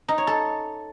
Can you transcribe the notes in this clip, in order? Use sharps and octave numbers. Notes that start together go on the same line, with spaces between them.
D#4
C#5
A4